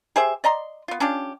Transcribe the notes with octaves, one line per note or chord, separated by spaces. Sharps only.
G4 G#4 C5 E5
D5 D#5 A#5 C6
B3 F4
C#4 D4 F4 G4